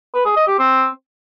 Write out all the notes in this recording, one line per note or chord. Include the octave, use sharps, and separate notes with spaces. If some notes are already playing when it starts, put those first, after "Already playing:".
B4
G#4
D#5
G4
C4